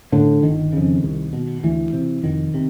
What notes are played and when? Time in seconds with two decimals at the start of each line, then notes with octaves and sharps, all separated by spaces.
0.12 A2 D3
0.43 G1 D#3
0.73 F2 C#3
1.03 C2
1.33 B2
1.64 D2 E3
1.93 C3
2.23 F1 D#3
2.54 C3